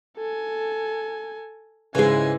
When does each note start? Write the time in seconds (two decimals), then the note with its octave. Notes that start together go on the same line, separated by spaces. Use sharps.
0.17 A4 G#5
1.95 G#2 C#3 E3 G#3 G#5